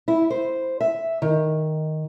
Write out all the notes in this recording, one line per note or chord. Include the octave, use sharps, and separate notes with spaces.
E4
C5
E5
D#3